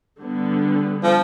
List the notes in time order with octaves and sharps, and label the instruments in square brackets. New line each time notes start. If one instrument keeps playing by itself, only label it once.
[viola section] D3 G3 B3
[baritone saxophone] F3